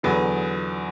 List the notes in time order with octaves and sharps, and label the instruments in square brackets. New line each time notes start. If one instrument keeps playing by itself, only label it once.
[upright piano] E2 D3 F#3 B4